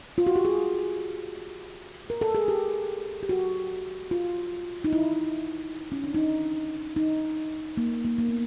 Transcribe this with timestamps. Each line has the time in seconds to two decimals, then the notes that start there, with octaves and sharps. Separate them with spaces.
0.18 F4
0.27 F#4
0.36 G4
0.45 G#4
2.10 A#4
2.21 A4
2.35 G#4
2.48 G4
3.23 G4
3.29 F#4
4.11 F4
4.84 D#4
4.93 E4
5.92 C#4
6.04 D4
6.14 D#4
6.96 D#4
7.77 A#3
8.05 A#3
8.18 A#3
8.29 B3